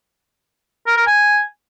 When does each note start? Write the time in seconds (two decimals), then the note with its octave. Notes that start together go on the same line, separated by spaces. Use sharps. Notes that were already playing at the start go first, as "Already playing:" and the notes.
0.87 A#4
0.97 A#4
1.07 G#5